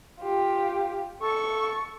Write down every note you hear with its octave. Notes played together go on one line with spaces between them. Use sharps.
F4 G4
A4 C#6